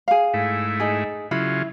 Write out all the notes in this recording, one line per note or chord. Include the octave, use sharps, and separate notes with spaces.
G#4 F5
G#2 A3 E4
D#4 G#4
C#3 F#3 E4 F4